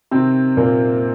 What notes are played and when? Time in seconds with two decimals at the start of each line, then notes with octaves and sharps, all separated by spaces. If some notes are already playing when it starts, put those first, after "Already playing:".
0.11 C3 D#3 C4
0.57 A#2 A#3